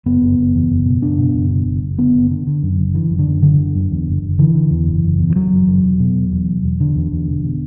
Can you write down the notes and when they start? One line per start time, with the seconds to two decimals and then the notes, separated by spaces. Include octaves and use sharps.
0.06 F#1 B3
0.21 F#1
0.38 F#1
0.54 E2
0.69 F#1
0.86 B2
1.02 F#1 D4
1.18 B2
1.34 F#1
1.50 B2
1.66 F#1
1.82 F#1
1.98 D3 B3
2.14 F#1
2.31 D3
2.47 D3
2.63 F#2
2.78 F#1
2.94 D3 E3
3.11 F#2
3.19 D3
3.27 F#2
3.42 F#1 D3
3.58 F#1
3.75 F#2
3.91 E2
4.07 F#1
4.22 F#1
4.39 D3 E3
4.54 D3
4.71 E2
4.87 F#1
5.03 F#1
5.19 E2
5.30 E3
5.35 E2 F#3
5.51 F#1
5.67 F#1
5.83 E1
6.00 B2
6.16 E1
6.32 E2
6.48 E1
6.63 E1
6.80 E2 D3
6.96 E2
7.12 E2
7.28 E1
7.44 B2